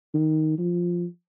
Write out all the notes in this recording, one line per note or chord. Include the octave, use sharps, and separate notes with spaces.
D#3
F3